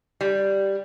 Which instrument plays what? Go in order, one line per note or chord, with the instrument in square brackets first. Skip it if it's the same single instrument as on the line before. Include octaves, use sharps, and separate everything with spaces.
[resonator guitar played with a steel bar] G3